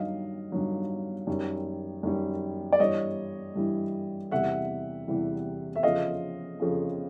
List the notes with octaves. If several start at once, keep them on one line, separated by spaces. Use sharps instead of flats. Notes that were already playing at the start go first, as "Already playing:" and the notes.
Already playing: G2 D#3 F#3 D#5 F5
G2 D#3 F#3
F#2 D#3 G3
F#2 D#3 G3
D5
G2 E3 G3 C#5 D#5
G2 E3 G3
E2 C3 E3 G3 E5 F#5
E2 C3 E3 G3
E5
F2 C#3 F3 D#5 F5
F2 C#3 F3